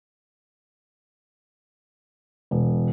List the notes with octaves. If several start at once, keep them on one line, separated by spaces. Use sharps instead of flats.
E1